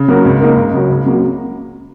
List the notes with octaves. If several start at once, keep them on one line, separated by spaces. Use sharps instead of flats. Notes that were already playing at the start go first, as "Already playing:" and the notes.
Already playing: C#3
F#3 A#3 F#4 A#4
C#2
C#3 A#3 D#4 A#4
C#2
C#3 F#3 C#4 F#4
C#2
C#3 F#3 A#3 F#4